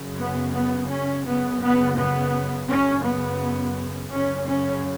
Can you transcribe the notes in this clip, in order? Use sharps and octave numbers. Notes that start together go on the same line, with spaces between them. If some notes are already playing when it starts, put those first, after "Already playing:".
Already playing: F#2 C#3
B3
B3
C#4
F#2 C#3 B3
B3
B3
F#2 C#3 C#4
B3
F#2 C#3 C#4
C#4